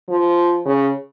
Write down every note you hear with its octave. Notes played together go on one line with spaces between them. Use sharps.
F3
C#3